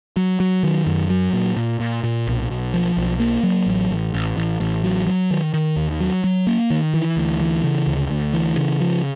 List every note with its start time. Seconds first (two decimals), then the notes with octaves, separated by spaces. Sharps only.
0.17 F#3
0.40 F#3
0.63 D#3
0.87 F#2
1.10 F#3
1.33 A#2
1.57 A#2
1.80 A#2
2.04 A#2
2.27 B1
2.50 B1
2.74 F3
2.97 B1
3.20 A#3
3.43 F#3
3.67 A1
3.91 A1
4.14 A1
4.37 A1
4.60 A1
4.83 F#3
5.07 F#3
5.31 D#3
5.54 D#3
5.76 D#2
6.00 F#3
6.24 F#3
6.47 A#3
6.70 D#3
6.94 E3
7.17 D2
7.40 E3
7.64 C#3
7.87 D2
8.11 D2
8.34 E3
8.57 C#3
8.81 F3